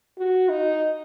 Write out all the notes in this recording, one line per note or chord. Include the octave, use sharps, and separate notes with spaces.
F#4
D#4